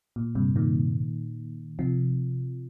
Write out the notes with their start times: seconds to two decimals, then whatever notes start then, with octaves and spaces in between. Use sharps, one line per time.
0.16 A#2
0.35 G2 C3
0.56 A#2 D#3
1.79 C3 F3